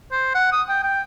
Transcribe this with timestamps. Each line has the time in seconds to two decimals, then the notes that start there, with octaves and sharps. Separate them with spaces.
0.12 C5
0.34 F#5
0.52 D#6
0.69 G5
0.83 G5